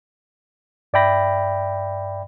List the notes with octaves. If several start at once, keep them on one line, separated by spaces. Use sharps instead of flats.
G2 D5 E5 G5 B5 A#6